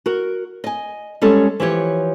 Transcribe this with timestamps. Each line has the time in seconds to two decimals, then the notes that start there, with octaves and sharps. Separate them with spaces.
0.06 F#4 A#4
0.64 D#5 G#5
1.22 G3 G#3 C#4 A4
1.60 E3 F3 G4 C#5